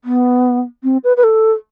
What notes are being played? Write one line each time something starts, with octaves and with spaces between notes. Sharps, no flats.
B3
C4
B4
B4
A4